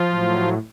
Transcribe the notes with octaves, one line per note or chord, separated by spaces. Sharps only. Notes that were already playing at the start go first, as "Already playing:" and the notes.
Already playing: F3 F4
A2 F#3